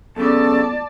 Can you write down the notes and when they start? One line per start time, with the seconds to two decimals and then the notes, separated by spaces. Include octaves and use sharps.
0.16 B1 C#3 B3 A4 D5 A5